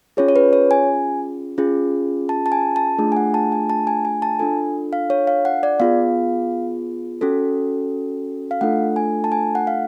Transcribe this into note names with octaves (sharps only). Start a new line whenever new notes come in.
C#4 F4 G#4 C#5
C#5
B4
C#5
G#5
C#4 F4 G#4
A5
A5
G#5
A5
A3 D4 F4 G#4
G#5
F#5
A5
G#5
A5
G#5
G#5
A5
D4 F4 A4 G#5
F5
C#5
F5
F#5
D5
B3 F4 G#4 F5
C#4 F#4 A4
F5
A3 D4 F4 A4 F#5
G#5
A5
G#5
F#5
F5